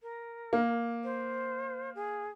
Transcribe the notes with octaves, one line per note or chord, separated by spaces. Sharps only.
A#4
A#3
C5
G#4